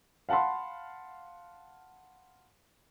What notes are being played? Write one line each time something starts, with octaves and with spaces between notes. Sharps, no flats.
F5 F#5 A5 B5 C6